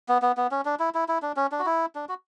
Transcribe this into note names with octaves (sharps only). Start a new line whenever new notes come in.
B3
B3
B3
C#4
D4
E4
E4
E4
D4
C#4
D4
F#4
E4
D4
F#4